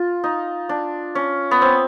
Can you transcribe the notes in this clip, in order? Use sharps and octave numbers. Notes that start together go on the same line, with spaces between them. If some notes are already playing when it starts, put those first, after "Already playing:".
Already playing: F4
D#4
D4
C#4
B3
C4